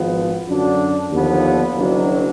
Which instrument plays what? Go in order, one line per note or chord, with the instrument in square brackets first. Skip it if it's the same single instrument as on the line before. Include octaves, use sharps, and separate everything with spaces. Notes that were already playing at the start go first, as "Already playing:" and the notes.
Already playing: [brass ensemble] G#1 G#2 F3 B3
F#2 D3 F#3 D4
D#2 D3 F3 B3
F#1 F#2 D#3 F#3 D4